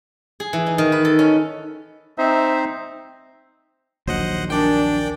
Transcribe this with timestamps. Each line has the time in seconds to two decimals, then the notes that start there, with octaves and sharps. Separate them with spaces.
0.40 G#4
0.53 E3
0.66 D#4
0.78 D#3
0.92 B4
1.05 A4
1.19 C#4
2.18 C4 D#4 C5 E5
4.07 A#1 D#2 F#3 C5 D#5 F#5
4.50 D4 A#4 D5 G5 G#5